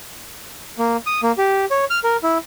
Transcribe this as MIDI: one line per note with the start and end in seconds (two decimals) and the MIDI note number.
0.78 0.97 58
1.06 1.21 87
1.23 1.32 58
1.38 1.65 67
1.71 1.85 73
1.90 2.00 89
2.04 2.17 70
2.23 2.38 64